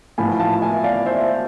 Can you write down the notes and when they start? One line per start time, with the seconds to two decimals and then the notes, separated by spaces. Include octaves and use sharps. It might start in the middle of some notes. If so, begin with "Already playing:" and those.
0.18 A1 A2 F3 G#5 B5
0.40 F5 A5
0.62 E5 G#5
0.84 D5 F5
1.06 C5 E5